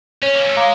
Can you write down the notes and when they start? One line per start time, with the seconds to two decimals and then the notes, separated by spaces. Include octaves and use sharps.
0.22 C#4 C#5
0.35 A#3
0.46 A3
0.56 G#3 F5 A#5 D6